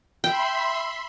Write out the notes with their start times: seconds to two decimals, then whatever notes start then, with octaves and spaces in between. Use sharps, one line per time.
0.24 E5 G5 B5 C6